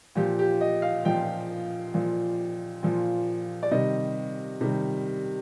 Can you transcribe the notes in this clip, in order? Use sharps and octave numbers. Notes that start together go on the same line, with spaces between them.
A#2 F3 G4
G4
D#5
F5
A#2 F3 G5
A#2 F3
A#2 F3
D5
C3 D#3 G3 D#5
C3 D#3 G3